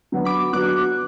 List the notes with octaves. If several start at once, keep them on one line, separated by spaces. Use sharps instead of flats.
D3 F#3 B3 F#4
B5 D6
D3 F#3 B3 F#4 D6 F#6